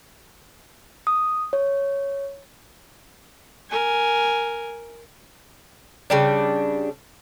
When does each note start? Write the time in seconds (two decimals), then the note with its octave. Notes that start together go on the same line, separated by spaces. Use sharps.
1.07 D#6
1.53 C#5
3.70 A#4 G#5
6.10 C#3 G3 D4